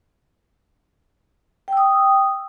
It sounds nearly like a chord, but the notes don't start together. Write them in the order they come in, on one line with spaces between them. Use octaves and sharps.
G5 E6 D#6